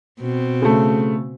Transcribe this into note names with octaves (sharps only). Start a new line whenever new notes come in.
B2 C4
C#3 A3